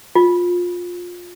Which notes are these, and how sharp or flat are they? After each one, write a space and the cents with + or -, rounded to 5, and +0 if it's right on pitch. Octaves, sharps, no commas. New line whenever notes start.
F4 +20